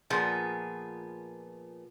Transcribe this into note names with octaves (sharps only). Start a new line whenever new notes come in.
A#2 F3 B3 G#4